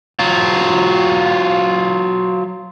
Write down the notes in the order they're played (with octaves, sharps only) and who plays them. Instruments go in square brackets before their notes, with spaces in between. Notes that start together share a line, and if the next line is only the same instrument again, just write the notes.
[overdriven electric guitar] F#3 F4